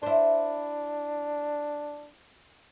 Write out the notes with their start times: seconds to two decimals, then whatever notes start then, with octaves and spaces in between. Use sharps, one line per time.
0.03 D4 E4 C5